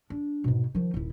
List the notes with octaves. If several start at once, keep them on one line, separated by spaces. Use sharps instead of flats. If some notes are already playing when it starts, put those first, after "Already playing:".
D4
G#2 B2
D#3 F3
D#1 E4